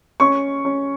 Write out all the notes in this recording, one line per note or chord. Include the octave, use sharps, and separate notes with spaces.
C#4 C#6
C#4